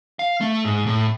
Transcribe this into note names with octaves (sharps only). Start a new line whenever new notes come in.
F5
A3
G#2
A2